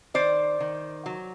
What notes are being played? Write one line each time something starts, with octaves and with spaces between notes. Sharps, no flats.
D#3 C5 D5
D#3
F#3